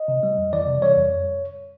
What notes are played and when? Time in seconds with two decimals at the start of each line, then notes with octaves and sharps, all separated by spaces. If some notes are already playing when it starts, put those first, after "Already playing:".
Already playing: D#5
0.08 C3
0.23 G3
0.38 F2
0.53 E3 D5
0.67 C3
0.82 G3 C#5
0.96 F2